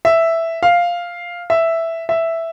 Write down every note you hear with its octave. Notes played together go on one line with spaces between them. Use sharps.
E5
F5
E5
E5